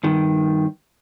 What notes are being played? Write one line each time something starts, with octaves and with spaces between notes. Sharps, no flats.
G2 D#3